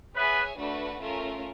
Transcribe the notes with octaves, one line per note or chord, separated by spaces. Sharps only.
B3 G#4 B4 C#5 E5 G#5
A3 D4 F#4 B4
A3 C#4 F4 A#4